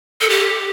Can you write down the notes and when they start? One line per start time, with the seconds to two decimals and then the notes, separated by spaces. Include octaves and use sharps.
0.21 A4
0.29 G4